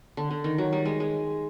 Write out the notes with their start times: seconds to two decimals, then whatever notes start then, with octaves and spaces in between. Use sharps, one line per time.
0.17 D3
0.31 D3
0.44 D#3
0.58 F#3
0.73 G3
0.85 G#3
1.00 G#3